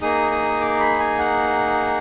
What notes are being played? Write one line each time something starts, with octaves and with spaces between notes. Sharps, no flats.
A#3 D#4 G#4 D#6
D#6
D6
B5
G#5
F#5